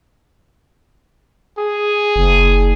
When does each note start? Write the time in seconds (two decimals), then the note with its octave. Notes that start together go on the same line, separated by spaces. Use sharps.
1.58 G#4
2.16 F#1